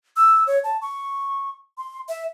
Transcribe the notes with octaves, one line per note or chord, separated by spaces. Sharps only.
E6
C#5
A5
C#6
C6
E5